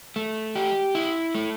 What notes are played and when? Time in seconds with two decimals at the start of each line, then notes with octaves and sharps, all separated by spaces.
0.16 A3
0.56 G4
0.95 E4
1.35 A3